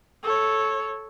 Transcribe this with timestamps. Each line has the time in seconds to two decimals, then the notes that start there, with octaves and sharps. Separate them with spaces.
0.23 A4 C#5